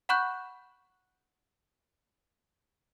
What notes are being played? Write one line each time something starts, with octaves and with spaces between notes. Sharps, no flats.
F#5 B5 C#6 F#6 G6